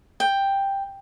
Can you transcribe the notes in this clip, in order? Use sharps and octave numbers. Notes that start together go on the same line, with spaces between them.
G5